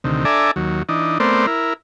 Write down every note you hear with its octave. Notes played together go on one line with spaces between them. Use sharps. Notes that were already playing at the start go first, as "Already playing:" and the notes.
D2 C3 D#3
D4 A4 D5 E5 G#5 A#5
D#2 F#3
E3 D4 D#4
A3 B3 C4 A#4 C5 D5
E4 A#4